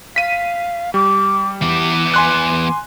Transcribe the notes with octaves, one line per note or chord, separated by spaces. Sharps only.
F5 B6 D#7
G3 D6
E3 B3 D6
G#5 C6 F#6